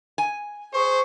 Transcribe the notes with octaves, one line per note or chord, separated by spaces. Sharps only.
G#5
G#4 C5 C#6